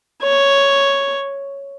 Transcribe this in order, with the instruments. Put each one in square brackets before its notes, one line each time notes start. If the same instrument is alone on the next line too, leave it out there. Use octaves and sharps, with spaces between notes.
[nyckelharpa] C#5